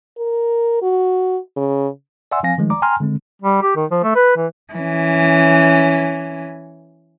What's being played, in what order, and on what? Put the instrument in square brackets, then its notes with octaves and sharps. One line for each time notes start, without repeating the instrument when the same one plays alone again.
[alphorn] A#4
F#4
C#3
[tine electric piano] D5 E5 F#5 G#5 C6 E6
F3 C4 F5 G#5 A#6
D#3 F3 G#3 A3 D#4
D5 A#5 D6
G5 G#5 A#5 C6 F6
D3 G#3 C4
[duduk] G3
G4
D#3
F3
A3
B4
E3
[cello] E3 C#4